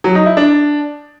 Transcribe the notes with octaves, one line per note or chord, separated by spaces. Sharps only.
F#3
D#4
E4
D4